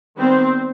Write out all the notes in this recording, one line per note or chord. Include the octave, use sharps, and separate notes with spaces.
D#3 G3 B3 C4 C5